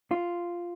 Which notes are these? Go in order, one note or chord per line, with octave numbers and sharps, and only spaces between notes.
F4